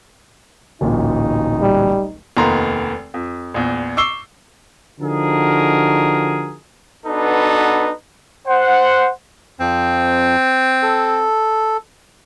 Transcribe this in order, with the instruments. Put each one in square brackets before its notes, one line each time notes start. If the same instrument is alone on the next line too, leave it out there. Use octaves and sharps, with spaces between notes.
[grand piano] D1 A1 A#2 [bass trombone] D#4
[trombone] G3
[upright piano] F1 D#2 D#3 B3 A#5 C6
F2
A#1 E2
C#6 D6 E6 C7 G7
[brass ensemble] D3 F3 D#4 F#4 G#4 A#4
[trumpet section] B3 D4 D#4 F#4 A4 B4
C5 F#5
[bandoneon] F2 F3 [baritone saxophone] C4
[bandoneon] A4